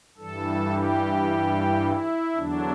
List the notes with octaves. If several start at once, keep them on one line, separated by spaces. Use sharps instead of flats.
G2 E3 G3 A4
G4
E4
E2 D3 F#3 D4